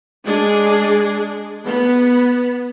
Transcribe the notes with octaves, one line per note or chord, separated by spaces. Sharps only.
G#3 D4 G#4
B3